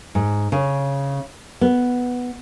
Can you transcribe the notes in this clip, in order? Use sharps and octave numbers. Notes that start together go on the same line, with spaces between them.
G#2
C#3
B3